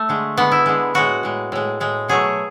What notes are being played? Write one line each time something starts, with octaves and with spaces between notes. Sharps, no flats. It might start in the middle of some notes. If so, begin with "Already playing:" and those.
Already playing: A3
D3 G#3
D3 G#3 B3
E4
D3 G#3
A2 G#3 F#4
A2 G#3
A2 G#3
A2 G#3
B2 F#3 A3 G#4